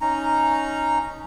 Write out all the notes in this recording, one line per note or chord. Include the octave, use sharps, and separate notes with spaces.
C#4 D#4 A#5